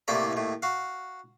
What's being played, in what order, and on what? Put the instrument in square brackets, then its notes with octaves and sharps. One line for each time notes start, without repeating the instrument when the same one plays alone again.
[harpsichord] C2 A2 C3 A#3 A4 D5
D#2 A2
F#4 F5